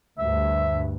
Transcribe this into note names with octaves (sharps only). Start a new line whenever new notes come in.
D2 G2 E5